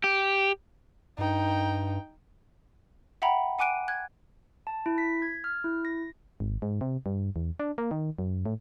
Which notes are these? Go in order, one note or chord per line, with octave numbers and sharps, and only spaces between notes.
G4
G2 D#4 G5
E5 F#5 G5 A#5 B5
F#5 G#5 D6 F#6 D7 D#7
F#6 G#6
A5
E4
B6
G#6
F6
E4
A#6
G#1
G#2
C3
G2
E2
D4
A#3
D#3
F#2
A2